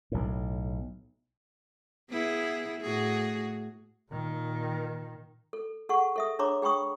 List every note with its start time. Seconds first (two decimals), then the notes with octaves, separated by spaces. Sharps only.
0.12 B1 A2
2.10 B3 E4 G#4
2.81 A2 F#4 G#4
4.10 A#2 D#3
5.53 A4
5.89 G#4 A4 F#5 C#6
6.16 A4 E5 D#6
6.39 D4 G#4 C#5 A#5 C6 D6
6.62 G#4 G5 B5 C#6 D#6